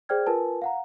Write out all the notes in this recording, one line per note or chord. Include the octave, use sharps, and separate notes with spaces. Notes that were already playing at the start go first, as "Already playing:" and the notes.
G#4 C5 D5 G5 F6 G#6
F4 A#4 B4 G#5 A5
F5 F#5 A#5